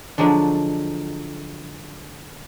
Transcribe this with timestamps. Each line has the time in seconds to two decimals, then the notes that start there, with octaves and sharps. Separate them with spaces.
0.18 D3 F3 F#3 G#3 D4